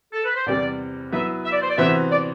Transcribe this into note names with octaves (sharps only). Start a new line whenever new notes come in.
A4
B4
C5
E2 C3 G3 D5
F#3 B3 E4 B4 E5
E5
D5
C5
D5
C3 E3 B3 F#4 C5 E5
D5